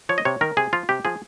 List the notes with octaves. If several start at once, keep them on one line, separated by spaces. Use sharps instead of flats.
F3 C#5
D#5
C3 C#5
D#3 A#4
C3 G#4
F3 F4
C3 G4
F3 G#4